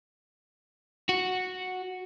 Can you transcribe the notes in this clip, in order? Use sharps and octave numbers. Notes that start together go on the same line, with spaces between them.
F#4